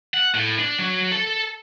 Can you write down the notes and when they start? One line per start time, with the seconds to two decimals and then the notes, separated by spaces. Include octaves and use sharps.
0.14 F#5
0.34 A2
0.59 D4
0.78 F#3
1.11 A4